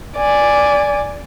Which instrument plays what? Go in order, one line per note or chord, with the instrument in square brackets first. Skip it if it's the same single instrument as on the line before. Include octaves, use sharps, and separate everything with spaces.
[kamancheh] D5 G#5